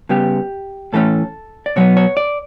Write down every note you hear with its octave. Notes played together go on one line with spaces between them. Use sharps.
C#3 G3 B3 G4
A2 E3 A3 C#4 A4
D5
B2 F#3 B3 C#5
C#5
D5